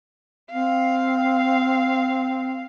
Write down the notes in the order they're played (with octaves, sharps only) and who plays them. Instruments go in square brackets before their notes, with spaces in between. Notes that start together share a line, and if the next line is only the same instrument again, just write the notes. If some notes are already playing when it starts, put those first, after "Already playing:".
[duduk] C4 [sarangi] F5